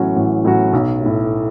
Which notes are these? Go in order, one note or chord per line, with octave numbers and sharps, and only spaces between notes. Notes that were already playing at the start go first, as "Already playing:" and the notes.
Already playing: A1 A2 F#3 C#4 F#4
A1
A2 F#3 C#4 F#4
B1
A2 A3